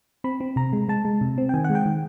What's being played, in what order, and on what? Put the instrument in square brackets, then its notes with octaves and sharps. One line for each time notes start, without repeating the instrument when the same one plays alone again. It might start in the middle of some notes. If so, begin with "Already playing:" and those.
[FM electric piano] C4 B5
C4
C3 A#5
G#3
G#3 A5
G#3
C3
C4
G5
D#3 G#5
F#5
G#3
G5
D#3